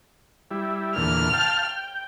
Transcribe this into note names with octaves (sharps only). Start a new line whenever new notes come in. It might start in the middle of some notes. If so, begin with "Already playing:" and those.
G3 E4
E2 A#2 D3 F6
F5 G5 A5
G5